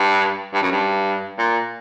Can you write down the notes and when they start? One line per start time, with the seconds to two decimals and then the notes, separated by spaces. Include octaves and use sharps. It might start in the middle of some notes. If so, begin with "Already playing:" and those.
Already playing: G2
0.53 G2
0.63 F#2
0.72 G2
1.39 A#2